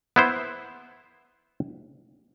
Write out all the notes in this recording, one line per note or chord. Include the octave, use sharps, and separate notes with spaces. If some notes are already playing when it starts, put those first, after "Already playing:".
B3 E4 C5